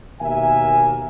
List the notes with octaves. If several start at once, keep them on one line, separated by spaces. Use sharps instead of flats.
D#2 B2 A#3 A#4 E5 G#5